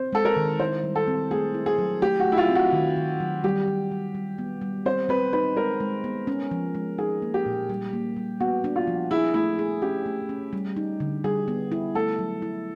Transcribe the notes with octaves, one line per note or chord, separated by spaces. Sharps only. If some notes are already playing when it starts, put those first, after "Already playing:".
Already playing: C4 C5
G#3 A4
A#4
D#3
E4 C5
G3
A4
C4
A3 G#4
E4
G#4
F#3
A3 G4
F#4
A3
E4
F4
C4
F#4
D#3
D#3
F#3
G3 G4
G3
G3
G3
B3
G3
C4 C5
C4 B4
D#4 B4
G#3 A#4
G#3
B3
C#4
F3
G#3
D#4 G#4
A#3
G4
A#2
G3
A#3
G3
B3 F#4
D4
F4
F3
E4 G#4
A3 E4
G#4
C#4 G4
A3
C#4
G3
D#4
D3
G3 G#4
B3
E4
A3 A4
F#3
E4